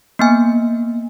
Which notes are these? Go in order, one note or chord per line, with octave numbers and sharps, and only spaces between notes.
A#3 B3 G#5